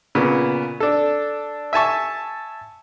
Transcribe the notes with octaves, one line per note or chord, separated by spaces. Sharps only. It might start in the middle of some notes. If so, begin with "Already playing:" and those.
A#2 C#3 B3
D4 A4
E5 G#5 A5 C#6